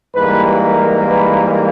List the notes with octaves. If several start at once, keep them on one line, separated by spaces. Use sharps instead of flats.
G#2 E3 G3 A#3 B4
A#4
B4